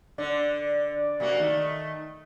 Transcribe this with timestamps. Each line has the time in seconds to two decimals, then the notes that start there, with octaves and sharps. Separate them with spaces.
0.18 D3 D5
1.20 C3 A#3 F#4
1.39 D#3 A3